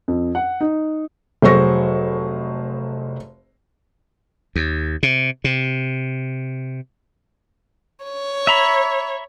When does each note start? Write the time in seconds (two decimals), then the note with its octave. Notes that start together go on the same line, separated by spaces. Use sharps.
0.08 F2
0.35 F#5
0.61 D#4
1.42 F1 F#3 G#4 C5 C#6 A#6
4.56 D#2
5.03 C3
5.44 C3
8.04 C#5
8.47 E5 A#5 B5